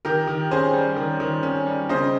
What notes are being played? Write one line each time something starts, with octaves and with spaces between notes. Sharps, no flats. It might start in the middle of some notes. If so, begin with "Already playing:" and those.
D#3 G4 A#4
D#3
C#4 G#4 C5
G3
D#3
D#3
C#4
G3
C#3 C5 D#5